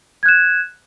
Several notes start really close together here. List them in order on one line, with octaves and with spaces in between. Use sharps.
G#6 F#6 E7